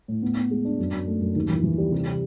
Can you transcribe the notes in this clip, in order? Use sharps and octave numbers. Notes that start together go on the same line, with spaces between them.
A2
B3
B3
G#3
D4
F#2
F#2
A3
F#2
D#2
E3
E3
G3
C3
C3